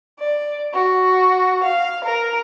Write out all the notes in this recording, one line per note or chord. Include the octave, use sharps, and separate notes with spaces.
D5
F#4
F5
A#4